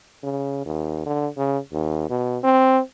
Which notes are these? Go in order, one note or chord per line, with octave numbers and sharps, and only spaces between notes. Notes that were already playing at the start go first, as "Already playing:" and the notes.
C#3
D#2
D3
C#3
D#2
B2
C4